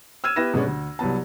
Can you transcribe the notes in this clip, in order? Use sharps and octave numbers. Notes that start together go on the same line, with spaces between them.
E6 F6 G#6 D#7 E7
B3 E4 G4 B4 A#6 E7
B2 G#3 B3 C#4 D4
D2
C2 F#3 B3 A5